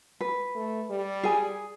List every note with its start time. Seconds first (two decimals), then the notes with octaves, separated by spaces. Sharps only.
0.21 B4
0.55 A3
0.91 G3
1.23 G#4 G#5